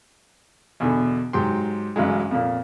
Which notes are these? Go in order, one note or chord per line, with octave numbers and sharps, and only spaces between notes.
E2 B2 D3
G#2 F#3 G4 G5 C6
A1 G2 C#3 F#3 G#3
F2 A#2